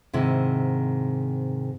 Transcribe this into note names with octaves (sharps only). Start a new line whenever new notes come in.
G#2 C3 D#3 E4